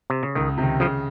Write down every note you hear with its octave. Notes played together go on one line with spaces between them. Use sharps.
C3
C#3
C#2 D#3
C3 D#3
C#3 F3